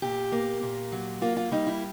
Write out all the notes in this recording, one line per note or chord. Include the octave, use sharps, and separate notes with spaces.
A#2 G4
A#3
A#2
F#3
A#3 F4
F4
G3 D#4
E4